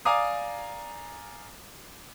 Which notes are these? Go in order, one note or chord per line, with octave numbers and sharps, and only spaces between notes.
D5 F5 G#5 A#5 D6 D#6